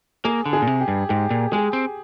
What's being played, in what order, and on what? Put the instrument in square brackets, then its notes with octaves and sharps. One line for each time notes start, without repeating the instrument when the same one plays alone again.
[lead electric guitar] A#3 [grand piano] G#4
[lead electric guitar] D3
[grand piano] G#4
[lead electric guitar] A#2
C3
[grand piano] G4
[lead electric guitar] G2
[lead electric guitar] G#2 [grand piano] G4
[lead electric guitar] A#2
[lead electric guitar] G#3 [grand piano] G#4
[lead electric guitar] C4